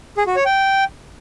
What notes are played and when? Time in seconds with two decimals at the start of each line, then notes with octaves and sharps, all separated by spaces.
0.17 G#4
0.27 F#4
0.36 C#5
0.45 G5